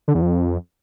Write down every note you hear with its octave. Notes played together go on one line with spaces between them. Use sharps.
D3
E2
F2